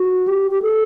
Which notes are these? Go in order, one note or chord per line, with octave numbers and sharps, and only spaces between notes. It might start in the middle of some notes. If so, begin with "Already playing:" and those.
Already playing: F#4
G4
G4
A4